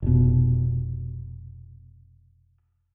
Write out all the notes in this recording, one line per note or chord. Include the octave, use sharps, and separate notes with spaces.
F1 B2